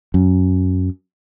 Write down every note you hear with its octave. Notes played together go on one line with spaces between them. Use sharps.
F#2